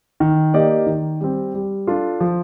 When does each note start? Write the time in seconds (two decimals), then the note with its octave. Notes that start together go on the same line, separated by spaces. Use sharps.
0.20 D#3
0.54 A#3 D#4 G4 D5
0.86 D#3
1.21 G3 C4
1.54 G3
1.87 D4 F4 A4
2.20 F3